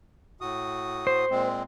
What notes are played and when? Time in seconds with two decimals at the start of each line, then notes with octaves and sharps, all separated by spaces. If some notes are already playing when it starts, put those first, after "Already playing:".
0.41 A2 F#4 D#6
1.07 C5
1.30 A#2 G#3 C4